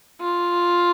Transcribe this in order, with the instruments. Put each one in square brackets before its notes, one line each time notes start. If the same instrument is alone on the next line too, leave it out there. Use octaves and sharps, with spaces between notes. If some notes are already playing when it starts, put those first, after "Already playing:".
[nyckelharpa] F4